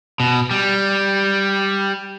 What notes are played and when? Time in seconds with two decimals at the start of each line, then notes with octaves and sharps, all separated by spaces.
0.20 B2
0.51 G3